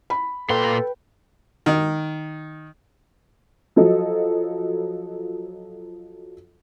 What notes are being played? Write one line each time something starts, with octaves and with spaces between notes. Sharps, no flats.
B5
A#2 A4 B4 G5 C6
D#3
F3 F#3 A4 D#5